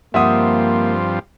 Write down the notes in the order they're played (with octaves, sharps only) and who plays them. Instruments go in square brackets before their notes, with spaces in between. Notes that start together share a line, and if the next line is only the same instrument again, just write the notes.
[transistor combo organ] G2 F3 C4 [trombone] A#3 [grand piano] E5 F#5 D#6